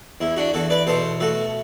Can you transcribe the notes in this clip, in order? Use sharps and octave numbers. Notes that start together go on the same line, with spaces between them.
E2 E4
D4 F#4
E2 F#4 A4
B4 D5
B2 A4 C5
A3 F#4 A4